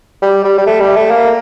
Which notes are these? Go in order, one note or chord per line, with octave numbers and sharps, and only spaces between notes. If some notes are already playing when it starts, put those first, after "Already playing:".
G3
G3
G3
A3
G3
A3
A#3